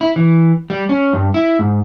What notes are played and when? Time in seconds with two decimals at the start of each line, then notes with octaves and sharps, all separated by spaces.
0.01 E4
0.16 E3
0.70 G3
0.89 C#4
1.13 G2
1.34 E4
1.59 G#2